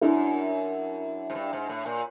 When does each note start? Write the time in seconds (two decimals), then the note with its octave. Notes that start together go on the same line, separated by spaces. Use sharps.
0.01 F#2 D4 E4
1.30 G#2
1.35 G2
1.53 G#2
1.69 A2
1.86 A#2